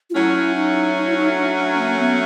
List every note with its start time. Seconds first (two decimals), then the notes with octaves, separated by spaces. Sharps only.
0.10 F4
0.14 F#3 A3 C#4 E4
0.55 D#4
0.96 D#4
1.06 E4
1.16 D#4
1.33 D#4
1.37 D4
1.78 A#3
1.98 B3